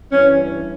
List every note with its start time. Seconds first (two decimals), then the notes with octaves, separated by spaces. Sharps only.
0.11 G2 E3 C#4